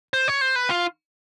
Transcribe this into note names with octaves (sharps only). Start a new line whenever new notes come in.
C5
C#5
C5
B4
F4